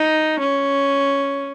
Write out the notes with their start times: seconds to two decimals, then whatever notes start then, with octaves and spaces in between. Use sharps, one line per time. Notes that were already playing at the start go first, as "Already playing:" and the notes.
Already playing: D#4
0.40 C#4